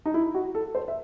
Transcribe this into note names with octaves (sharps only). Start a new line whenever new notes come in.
D#4
E4
F#4
A4
C5
E5